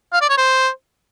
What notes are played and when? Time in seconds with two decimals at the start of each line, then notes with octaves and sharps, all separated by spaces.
0.13 F5
0.21 D5
0.29 C#5
0.38 C5